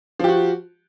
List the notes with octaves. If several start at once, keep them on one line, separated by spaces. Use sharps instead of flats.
F3 F#4 G4